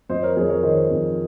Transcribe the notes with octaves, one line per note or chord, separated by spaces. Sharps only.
F2 C5 D#5
A#4 C#5
F2 G#4 C5
A#4 C#5
D#3 C5 D#5
F2